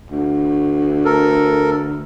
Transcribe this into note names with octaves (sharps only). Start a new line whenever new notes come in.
D2
A4 A#4